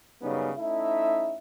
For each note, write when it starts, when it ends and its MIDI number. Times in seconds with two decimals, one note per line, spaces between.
0.22 0.50 42
0.22 0.50 49
0.22 0.50 55
0.22 0.50 59
0.22 0.50 61
0.22 0.50 63
0.57 1.38 57
0.57 1.38 61
0.57 1.38 63
0.57 1.38 64
0.57 1.38 76